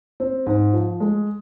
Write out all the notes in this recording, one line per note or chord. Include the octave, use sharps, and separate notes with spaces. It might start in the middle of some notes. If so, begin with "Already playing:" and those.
C4
G#2
F3
G#3